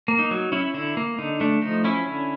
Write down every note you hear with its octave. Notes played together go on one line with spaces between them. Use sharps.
A#3
D#4
F#3
C#4 E4
D3 E4
A#3
D3 D#4
A3 D4
F3 D#4
C#4 E4
D3